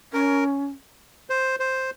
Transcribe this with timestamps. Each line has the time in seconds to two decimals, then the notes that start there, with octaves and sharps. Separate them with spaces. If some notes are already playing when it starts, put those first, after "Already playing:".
0.13 C#4 A#4
1.30 C5
1.60 C5